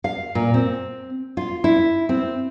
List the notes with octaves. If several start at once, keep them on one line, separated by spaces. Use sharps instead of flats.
F5
A#2
C4
F4
E4
C4